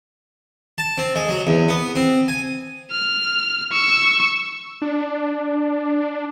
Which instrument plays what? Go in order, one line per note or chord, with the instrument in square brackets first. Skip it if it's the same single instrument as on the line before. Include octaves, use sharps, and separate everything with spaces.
[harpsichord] A5
C4
G#3
F#3
E2
B3
C4
G#5
[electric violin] F6
C#6 E6
[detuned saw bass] D4